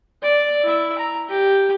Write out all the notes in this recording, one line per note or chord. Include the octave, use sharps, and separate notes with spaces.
D5
E4 E5
A#5
G4